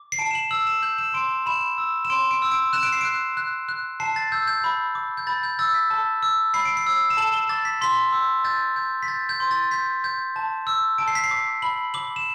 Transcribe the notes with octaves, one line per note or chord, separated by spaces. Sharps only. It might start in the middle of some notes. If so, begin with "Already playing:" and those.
Already playing: D6
C7
A5 D7
E7
F#7
E6 F#7
E7
G6 F#7
E7
C6 D7
E7
B5 E7
E6
E7
C6 D7
D7
E6
D7
F#6 E7
D7
C7
F#6 D7
F#6
F#6
A5 C7
A6
E6 G6
G6
B5
D6
G6
B5 A6
G6
E6 A6
B6
A5
E6
B5 C7
D7
C7
E6
E7
A5 F#7
G7
D6 A6
B6
C6 B6
E6
G6 A6
G6
B6
G6 A6
G6
C6
A6
G6 B6
G6
A5
E6
A5 D7
C7
B6
C7
D6
B5 F#7
D6 F#7
E7